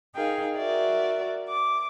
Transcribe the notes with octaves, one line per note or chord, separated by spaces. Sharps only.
D#4 G#4 A#4 F5 G5
F#4 A#4 D5 E5
D6